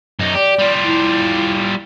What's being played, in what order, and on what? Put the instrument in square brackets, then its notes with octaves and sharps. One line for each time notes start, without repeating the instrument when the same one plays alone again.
[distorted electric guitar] F#2 D#4
[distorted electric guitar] G4 [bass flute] D5
[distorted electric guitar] G3 F4
[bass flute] E4